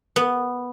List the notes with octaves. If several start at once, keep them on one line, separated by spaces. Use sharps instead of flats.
B3